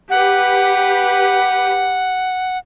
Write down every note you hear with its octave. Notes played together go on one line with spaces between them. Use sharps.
G4 B4 F#5